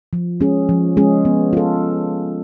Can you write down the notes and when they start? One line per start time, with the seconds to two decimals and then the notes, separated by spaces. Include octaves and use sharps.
0.13 F3
0.40 G#3 C#4 G#4
0.69 F3
0.97 G#3 C#4 G#4
1.25 B3
1.53 F4 A4